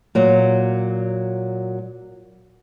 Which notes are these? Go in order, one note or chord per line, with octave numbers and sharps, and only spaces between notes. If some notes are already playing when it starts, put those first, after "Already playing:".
A#2 F#3